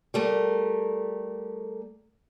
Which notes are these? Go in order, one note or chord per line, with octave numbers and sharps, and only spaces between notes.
G3 A3 A#4